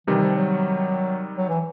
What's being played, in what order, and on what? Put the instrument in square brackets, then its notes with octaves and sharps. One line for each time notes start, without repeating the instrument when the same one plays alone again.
[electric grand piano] C3 D#3 G3 [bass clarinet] E3
[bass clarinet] F3
F#3
F#3
E3